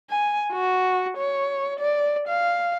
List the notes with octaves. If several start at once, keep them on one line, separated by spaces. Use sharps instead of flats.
G#5
F#4
C#5
D5
F5